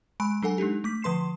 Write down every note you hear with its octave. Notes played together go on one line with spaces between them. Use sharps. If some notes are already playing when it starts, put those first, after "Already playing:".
G#3 G#5 B5 D7
F#3 D4 A4 F#5 G#5
G#3 D4 D#4 G4
A3 D6 B6
D3 F3 B4 C6 C7 E7